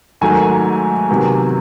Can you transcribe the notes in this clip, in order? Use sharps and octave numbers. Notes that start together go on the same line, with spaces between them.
G#2 D#3 F#3 A3 G#5
C3 D#3 F#3 B3